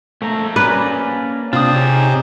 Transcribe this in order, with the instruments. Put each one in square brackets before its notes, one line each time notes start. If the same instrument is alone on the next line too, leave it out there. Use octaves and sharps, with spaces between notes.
[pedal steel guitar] A3 [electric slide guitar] A#3 C5 A#5
[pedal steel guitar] C#4 D5 [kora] B4
[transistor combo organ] C3 [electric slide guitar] D4 [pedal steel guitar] F4 D#6
[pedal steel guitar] D#4 C#5 [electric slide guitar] G4 G#4